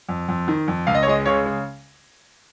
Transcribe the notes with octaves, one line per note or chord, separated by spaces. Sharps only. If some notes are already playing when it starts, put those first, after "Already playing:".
F2
F2
D#3
F2
C#2 F5
D#5
C#5
G#3 D#5
C#3 C#5
C#3